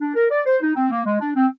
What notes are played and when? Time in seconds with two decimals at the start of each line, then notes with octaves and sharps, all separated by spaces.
0.01 D4
0.15 A#4
0.31 D5
0.46 C5
0.61 D#4
0.76 C4
0.91 A#3
1.06 G#3
1.21 D4
1.36 C4